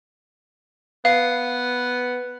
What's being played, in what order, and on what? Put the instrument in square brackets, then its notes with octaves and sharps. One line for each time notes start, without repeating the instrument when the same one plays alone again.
[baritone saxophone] B3 [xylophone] F5